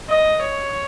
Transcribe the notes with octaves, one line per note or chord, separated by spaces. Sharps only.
D#5
C#5